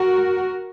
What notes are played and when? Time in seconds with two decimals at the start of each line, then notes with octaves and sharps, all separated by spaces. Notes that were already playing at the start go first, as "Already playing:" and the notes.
Already playing: F#4 A#4